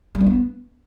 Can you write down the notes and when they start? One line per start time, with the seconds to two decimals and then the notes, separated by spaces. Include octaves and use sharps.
0.15 G3
0.21 C4
0.26 B3